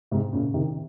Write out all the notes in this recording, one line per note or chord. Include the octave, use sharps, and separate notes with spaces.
G#2 C3
A#2 C#3
C3 D#3